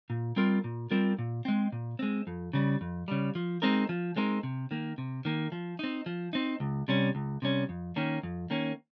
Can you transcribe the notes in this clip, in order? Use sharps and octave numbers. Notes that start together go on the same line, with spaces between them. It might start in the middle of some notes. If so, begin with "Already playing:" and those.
A#2
G3 C4 F4 A#4
A#2
G3 C4 F4 A#4
A#2
G#3 C4
A#2
G#3 C4
F2
C#3 G3
F2
C#3 G3
F3
G#3 C4 D#4 A#4
F3
G#3 C4 D#4 A#4
C3
D#3 A#3
C3
D#3 A#3
F3
C4 D#4
F3
C4 D#4
C#2
C3 G3 C#4
C#2
C3 G3 C#4
F2
D#3 A#3 C#4
F2
D#3 A#3 C#4